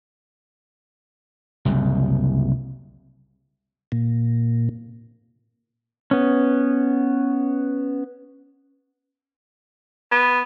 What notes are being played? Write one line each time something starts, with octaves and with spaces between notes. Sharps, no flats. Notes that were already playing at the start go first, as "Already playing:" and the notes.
F#1 C2 F#2
A#2
B3 C#4
B3